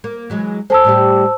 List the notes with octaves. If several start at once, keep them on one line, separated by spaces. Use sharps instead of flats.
A#3
E3 F#3 G#3
G#4 A4 C5 A5 E6
A2 G3 G4